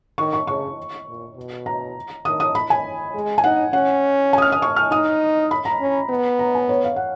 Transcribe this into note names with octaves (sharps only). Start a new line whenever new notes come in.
D#3 C#6
C#6
C#3 C#6
A#2
B2
A#5
D#3 D#6
D#6
B5
G#5
G#3
G#5
D#4 F#5
C#4 F#5
G#5 D#6
F6
D#6
C#6
F6
D#4 D#6
B5
A#5
C#4
B3
A#5
G#5
C#5
F5
F#5